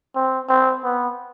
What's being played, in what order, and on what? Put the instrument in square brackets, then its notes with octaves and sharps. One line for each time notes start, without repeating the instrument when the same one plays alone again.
[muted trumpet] C4
C4
B3